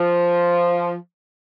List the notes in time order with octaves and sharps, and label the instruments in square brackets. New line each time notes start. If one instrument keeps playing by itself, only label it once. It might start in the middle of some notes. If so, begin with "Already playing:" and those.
Already playing: [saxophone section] F3